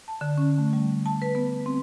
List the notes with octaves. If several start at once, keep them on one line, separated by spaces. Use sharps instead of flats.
A5
D3
C#4
A3
G3
A5
B4
B3
C4